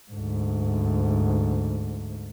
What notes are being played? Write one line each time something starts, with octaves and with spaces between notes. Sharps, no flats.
D2 G#2